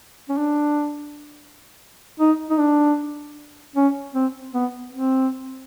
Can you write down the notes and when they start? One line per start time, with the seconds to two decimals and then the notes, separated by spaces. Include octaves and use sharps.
0.29 C#4
0.37 D4
2.20 D#4
2.50 D#4
2.58 D4
3.76 C#4
4.15 C4
4.54 B3
4.93 C4